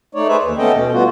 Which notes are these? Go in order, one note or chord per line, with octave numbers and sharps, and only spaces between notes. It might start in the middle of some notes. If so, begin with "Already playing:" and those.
A3 D#4 C#5 D5
G#4 B4 C5 E5
D#2
A3 B3 C#4 A4 D#5 G5
B2
G3 B3 F4 F#4